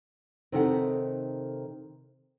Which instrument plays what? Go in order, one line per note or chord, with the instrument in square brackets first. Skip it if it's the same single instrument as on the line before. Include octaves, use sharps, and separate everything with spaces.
[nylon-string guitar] C3 D#3 D#4 A4 A#4 F#5